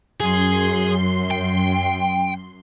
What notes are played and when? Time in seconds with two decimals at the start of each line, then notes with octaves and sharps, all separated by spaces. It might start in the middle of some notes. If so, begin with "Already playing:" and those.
0.20 F#2 G#4 C6
1.31 G5